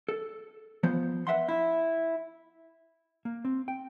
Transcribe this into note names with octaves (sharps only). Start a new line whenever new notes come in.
A4
F3 B3 C5
B4 E5 F#5 C6
E4
A#3
C4
G5